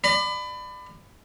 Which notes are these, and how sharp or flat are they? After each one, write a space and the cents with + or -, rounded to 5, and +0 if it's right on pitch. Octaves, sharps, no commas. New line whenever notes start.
D5 +30 B5 +25